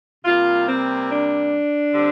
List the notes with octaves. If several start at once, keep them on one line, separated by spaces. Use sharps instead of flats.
C3 G3 A#3 F4
C4
D4
D3 G3 C4